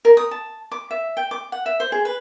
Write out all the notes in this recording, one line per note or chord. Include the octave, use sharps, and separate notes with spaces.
A#4
D#6
A5
D6
E5
G5
D6
F#5
E5
C5
G#4
B4